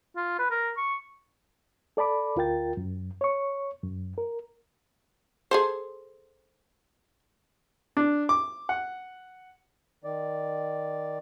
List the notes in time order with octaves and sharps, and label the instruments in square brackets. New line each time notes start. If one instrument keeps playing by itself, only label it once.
[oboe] F4
B4
A#4
C#6
[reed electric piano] A4 D5 A5 B5 D6
D2 F4 A#4 G5 A6
F#2
C#5 C#6
F#2
A#4
[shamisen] G#4 A4 C5
[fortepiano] D4
D6
F#5
[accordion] D#3 D5